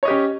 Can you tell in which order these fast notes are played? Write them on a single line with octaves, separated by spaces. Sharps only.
C#5 D#5 G4 C#4